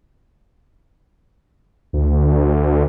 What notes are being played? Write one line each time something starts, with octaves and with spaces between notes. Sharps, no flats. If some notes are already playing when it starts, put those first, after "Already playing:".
D2